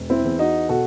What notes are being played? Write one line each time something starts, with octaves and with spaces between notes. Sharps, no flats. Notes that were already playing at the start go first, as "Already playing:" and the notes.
Already playing: E1
C4 E4
E2
D#4 F#4
B2 F#4 A4